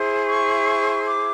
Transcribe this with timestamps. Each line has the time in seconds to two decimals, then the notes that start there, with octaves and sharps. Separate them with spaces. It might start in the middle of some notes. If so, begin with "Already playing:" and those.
Already playing: E4 G#4 C5
0.25 C#6
1.06 D6